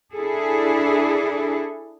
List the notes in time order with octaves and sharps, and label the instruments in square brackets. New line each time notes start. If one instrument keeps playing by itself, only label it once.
[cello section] D4 E4 G#4 A4